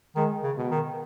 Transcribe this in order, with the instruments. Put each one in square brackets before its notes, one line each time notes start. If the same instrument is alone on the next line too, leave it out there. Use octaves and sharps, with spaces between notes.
[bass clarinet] D#3 [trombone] G#3
[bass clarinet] C#3
[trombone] B2
[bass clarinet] D#3